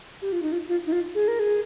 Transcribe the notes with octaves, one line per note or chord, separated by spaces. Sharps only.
G4
F4
D#4
F4
F4
D#4
F4
G#4
A#4
G#4